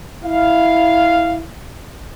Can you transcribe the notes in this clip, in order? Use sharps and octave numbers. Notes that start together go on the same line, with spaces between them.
E4 F5